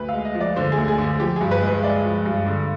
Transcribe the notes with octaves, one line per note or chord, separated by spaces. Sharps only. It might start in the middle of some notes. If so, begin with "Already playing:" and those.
Already playing: D2 B4
F5
G#3
D#5
F3
D5
D3 C5
G#4
D2
G#4
D3
G#4
F3 G4
G2 G#4
B4
G#3
B4
G#3 D5
F3
G2
D3